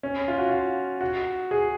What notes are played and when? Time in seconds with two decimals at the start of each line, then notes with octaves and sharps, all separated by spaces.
0.03 C#4
0.28 F4
0.38 F#4
0.49 F4
1.01 F#4
1.51 G#4